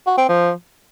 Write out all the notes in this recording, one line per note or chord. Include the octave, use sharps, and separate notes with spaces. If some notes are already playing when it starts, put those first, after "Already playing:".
F#4
C4
F3